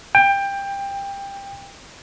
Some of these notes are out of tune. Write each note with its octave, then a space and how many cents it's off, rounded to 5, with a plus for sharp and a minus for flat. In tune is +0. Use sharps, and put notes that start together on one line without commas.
G5 +20